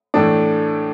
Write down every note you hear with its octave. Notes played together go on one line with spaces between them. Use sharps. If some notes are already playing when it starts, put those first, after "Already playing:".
A2 E3 A3 D4